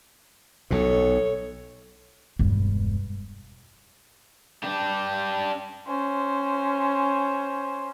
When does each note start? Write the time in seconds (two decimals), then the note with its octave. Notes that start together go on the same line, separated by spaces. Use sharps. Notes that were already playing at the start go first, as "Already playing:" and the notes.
0.70 B1 B2 A4 C#5
2.39 E1 G2
4.63 D4 G4
5.87 C#4 C5